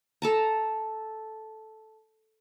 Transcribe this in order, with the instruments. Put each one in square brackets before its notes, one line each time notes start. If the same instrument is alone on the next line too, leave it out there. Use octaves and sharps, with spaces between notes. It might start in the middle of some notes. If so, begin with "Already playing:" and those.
[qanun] A4 A5 A#5